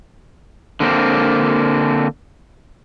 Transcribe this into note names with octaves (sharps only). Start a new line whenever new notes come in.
D3 A#3 C4